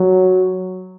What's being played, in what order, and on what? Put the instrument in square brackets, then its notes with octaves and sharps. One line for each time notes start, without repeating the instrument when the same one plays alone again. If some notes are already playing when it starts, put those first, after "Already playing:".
Already playing: [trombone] F#3